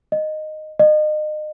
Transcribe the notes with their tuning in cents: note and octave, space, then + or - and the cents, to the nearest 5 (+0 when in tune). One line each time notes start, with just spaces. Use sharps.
D#5 -10
D#5 -30